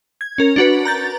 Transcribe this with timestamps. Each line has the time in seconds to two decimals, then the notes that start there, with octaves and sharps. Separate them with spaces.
0.21 G#6
0.38 C#4 A#4
0.56 D4 F#4 B4
0.85 A#5 G6 A6